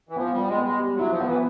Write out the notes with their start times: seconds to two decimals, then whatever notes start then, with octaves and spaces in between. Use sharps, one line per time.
0.09 E3
0.16 F3 B3
0.32 G3 B3
0.48 G#3
0.58 B3
0.63 G#3
0.79 G3
0.95 F#3 E4
1.10 F3
1.21 B3
1.26 E3